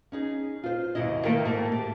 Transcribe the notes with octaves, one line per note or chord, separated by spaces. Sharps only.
C#4 D#4 G#4
F4 C5
D#2 G#2 B2 E4 D#5
D#3 A3 A#3 E4 A#4 G5
G#2 A3 A#3
G4